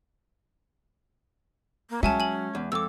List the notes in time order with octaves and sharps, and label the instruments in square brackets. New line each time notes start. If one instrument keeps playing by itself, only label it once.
[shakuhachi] A#3
[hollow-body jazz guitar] F#3 [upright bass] G#3 [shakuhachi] C#4 [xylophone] E5 G#5 A5
[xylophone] G#5 F#7
[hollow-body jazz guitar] E2
[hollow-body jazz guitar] F2 [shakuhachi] A4 [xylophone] D6 E6